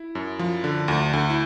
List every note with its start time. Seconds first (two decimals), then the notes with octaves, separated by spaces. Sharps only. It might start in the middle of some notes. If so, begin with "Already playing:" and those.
Already playing: E4
0.15 F#2
0.39 F3
0.64 D3
0.88 D2
1.13 D2
1.30 E4